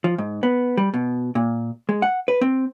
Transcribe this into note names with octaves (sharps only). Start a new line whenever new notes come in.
F3
G#2
B3
G3
B2
A#2
G#3
F#5
B4
C4